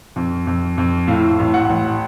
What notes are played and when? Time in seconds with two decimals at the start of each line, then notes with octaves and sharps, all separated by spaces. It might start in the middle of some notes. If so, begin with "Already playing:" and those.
0.16 F2
0.47 F2
0.77 F2
1.08 A2 F5
1.39 A1
1.54 F#5
1.69 A1